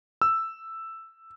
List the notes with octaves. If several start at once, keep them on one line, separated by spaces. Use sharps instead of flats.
E6